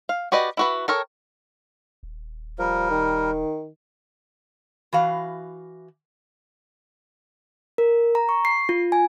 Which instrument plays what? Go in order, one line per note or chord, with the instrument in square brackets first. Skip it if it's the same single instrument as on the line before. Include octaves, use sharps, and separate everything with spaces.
[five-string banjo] F5
F#4 G4 B4 D5 D#5
E4 F#4 B4
A4 A#4 C#5 G5
[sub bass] D#1
[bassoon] F3 [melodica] G3 A#4
[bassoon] D#3
[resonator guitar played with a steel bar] E3 F#4 F5
[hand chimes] A#4
A#5
C#6
C7
F4
G#5